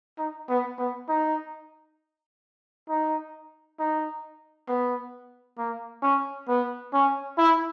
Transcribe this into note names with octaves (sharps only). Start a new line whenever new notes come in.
D#4
B3
B3
D#4
D#4
D#4
B3
A#3
C#4
B3
C#4
E4